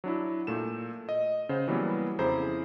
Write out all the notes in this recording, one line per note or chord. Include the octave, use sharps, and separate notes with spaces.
F#3 D4 E4
A#2 A3 E7
D#5
C#3 C5 F#5
E3 F#3 G3 A#3 B3
F2 C#3 E4 G#4 C5 A#5